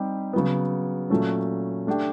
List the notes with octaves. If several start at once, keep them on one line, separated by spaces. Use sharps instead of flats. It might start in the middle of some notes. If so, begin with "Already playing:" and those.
Already playing: G3 C4 D#4 G4
C#3 F#3 B3
A#2 F#3 A3 C#4
A3 D4 G4